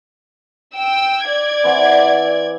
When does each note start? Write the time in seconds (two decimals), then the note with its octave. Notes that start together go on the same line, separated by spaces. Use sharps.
0.76 G5 E6
1.25 D5 G#6
1.64 E3 C4 F#5